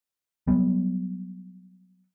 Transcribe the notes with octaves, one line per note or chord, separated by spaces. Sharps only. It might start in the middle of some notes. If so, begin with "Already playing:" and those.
F#3 G3 B3